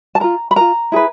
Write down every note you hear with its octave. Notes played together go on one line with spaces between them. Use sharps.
A5
F4 A#4 A#5
B5
F4 A#4 A#5
E4 G#4 B4